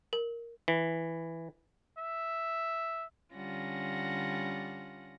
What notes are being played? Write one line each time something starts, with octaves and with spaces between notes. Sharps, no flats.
A#4
E3
E5
D3 G3 C#4 F4 F#5 A#6